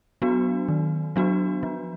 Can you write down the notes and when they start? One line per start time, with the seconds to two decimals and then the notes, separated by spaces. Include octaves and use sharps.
0.22 F#3 B3 D4 F#4
0.68 D#3
1.16 F#3 B3 D4 F#4
1.63 F3